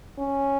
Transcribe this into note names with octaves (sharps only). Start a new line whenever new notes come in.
C#4